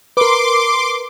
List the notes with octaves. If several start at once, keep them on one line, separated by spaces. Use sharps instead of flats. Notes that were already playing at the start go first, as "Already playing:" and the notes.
A#4 B4 C6 D6